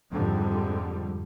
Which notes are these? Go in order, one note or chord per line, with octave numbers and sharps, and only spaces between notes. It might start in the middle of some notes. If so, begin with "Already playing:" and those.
F2 G#2 D3 F3 G3